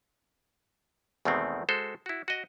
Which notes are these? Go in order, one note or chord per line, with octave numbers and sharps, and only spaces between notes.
E2 B2 D#3 G#3 A3 C4
G#3 F#4 A4 C5
E4 F#4
F#4 D#5